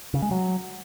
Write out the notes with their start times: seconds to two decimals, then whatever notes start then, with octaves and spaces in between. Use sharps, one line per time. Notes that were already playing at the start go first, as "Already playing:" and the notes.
0.14 C#3
0.22 G#3
0.31 F#3